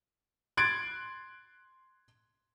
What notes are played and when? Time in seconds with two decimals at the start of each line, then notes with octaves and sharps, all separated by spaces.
0.57 C6 F#6 G#6 A6 D7